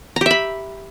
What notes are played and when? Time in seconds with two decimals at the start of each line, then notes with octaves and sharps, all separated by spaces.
0.16 A#5
0.21 G4
0.26 E5
0.31 B5